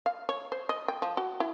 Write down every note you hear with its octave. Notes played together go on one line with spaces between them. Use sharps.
F5
C#5
C5
D#5
G5
F3
F#4
E4